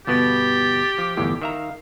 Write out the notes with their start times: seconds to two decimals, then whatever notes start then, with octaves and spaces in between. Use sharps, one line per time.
0.07 G1 B2 B3 G4 A6
0.98 F3 D6
1.17 G1 E2 A2
1.42 D#3 E5 F5 A#5